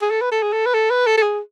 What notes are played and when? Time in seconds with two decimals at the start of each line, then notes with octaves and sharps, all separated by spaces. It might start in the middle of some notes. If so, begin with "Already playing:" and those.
0.02 G#4
0.10 A4
0.21 B4
0.31 A4
0.42 G#4
0.53 A4
0.66 B4
0.74 A4
0.90 B4
1.06 A4
1.17 A4
1.22 G#4